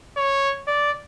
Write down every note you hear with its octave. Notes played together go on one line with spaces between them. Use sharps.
C#5
D5